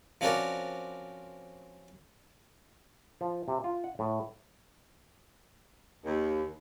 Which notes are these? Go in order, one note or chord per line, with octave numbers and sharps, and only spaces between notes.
F3 C4 C#4 F#4 A#4 D5
F3
C3
F4
F#5
A2
D#2